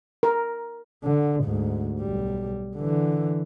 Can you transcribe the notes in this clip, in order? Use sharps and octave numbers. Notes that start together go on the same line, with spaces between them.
A#4
D3
D2 G#2
B1 G3
D3 E3